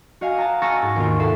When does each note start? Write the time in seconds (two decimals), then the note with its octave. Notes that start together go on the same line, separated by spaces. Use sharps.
0.21 F#4 D#5 F5 G#5
0.38 A5 A#5
0.62 G#5 C#6 E6 F6 A6 A#6
0.82 G#2 F#4
0.96 D#2 B2 F4
1.19 A4 E5 C7 E7